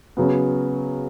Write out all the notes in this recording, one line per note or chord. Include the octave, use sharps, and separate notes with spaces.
C#3 F#3 B3